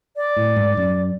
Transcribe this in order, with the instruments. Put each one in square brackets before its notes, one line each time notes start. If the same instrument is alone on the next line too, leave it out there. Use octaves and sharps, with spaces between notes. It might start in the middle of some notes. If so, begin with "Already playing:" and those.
[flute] D5
[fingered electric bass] A2
G#2
F#2